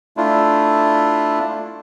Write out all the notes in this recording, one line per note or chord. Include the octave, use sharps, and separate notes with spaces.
A3 D4 E4 F4